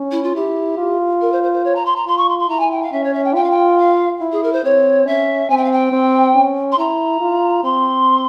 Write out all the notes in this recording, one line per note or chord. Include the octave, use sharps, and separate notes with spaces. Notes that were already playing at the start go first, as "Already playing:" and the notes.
Already playing: C#4
E4
F4
E4 G4
F4
A#4
C5
C5
C5
C#5
A#5
C6
A#5
F4 C6
C#6
C6
C6
E4 A#5
G#5
G5
F5
C#4 E5
C#5
E5
G5
F4 G5
F5
G5
F5
E4
G#4
A#4
C5
C4 C#5
C#4 E5
C4 G#5
G5
F5
G5
C4
C#4
C6
E4 A#5
F4
C4 C6